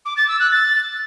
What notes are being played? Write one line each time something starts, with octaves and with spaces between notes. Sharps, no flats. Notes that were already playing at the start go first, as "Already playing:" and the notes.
D6
A6
E6
F#6
A6